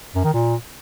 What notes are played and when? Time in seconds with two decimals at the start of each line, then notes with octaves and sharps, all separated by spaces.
0.15 F#2
0.24 D#3
0.33 A#2